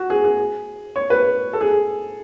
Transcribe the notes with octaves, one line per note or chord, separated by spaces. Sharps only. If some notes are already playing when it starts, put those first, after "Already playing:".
Already playing: F#4
G#4
G#4
C#5
B4
A4
G#4